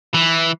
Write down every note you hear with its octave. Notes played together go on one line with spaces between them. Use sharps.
E3